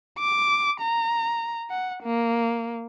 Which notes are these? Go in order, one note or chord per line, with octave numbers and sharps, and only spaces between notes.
D6
A#5
F#5
A#3